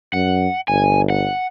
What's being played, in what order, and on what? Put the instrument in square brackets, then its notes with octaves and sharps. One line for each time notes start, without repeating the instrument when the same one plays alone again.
[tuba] F#2 [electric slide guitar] F#5
[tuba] G1 [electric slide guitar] G#5
[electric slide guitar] F#5